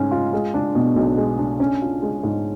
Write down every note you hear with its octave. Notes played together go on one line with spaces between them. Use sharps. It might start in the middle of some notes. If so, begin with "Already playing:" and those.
Already playing: G#2 C#4
F4
G#3
D4
B2
B1
G#3
D4
C#4
F4
G#3
G#2